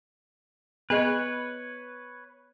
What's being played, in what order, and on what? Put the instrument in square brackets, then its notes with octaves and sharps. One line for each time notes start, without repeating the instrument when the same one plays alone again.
[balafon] B3 G#4 D#5 [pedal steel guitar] B4 C#5